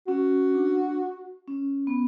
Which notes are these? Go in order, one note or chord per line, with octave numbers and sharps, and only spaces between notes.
C#4 F#4
D4
C#4
B3